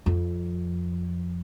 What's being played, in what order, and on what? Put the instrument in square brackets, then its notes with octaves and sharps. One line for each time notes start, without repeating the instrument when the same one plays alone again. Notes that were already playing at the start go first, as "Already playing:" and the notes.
[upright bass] F2